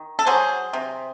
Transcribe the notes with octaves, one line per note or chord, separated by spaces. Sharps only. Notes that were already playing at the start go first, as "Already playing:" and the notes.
Already playing: D#3
A4
F#3 G#4 C5
C3